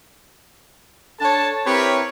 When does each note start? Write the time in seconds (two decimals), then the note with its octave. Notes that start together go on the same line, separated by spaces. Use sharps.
1.20 D4 A4 C#5 A5
1.66 C4 E4 G4 A#4 B4 C#5